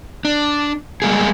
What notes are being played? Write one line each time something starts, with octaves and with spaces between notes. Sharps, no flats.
D4
G3 G#3 A#3 G#4